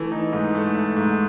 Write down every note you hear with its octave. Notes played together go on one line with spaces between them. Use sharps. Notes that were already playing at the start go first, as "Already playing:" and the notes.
Already playing: E3 A3
D#4
G#2
A3
A3
G#2